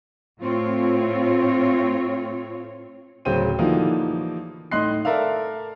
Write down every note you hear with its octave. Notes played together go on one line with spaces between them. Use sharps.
A2 A3 C4 F4 C#5
D1 C#3 F#3 C5 G5 D#7
D3 E3 F3 G3 A#3 D#4
A2 D#4 D#5 C6 F#6 C7
A4 A#4 D5 E5 F5